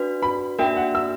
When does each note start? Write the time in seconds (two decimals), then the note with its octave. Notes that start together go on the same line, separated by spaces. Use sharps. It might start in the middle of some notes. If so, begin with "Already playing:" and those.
Already playing: D4 F#4 B4
0.22 B5
0.59 A#3 D4 F#4 A#4 E5 G5
0.77 F#5
0.95 E6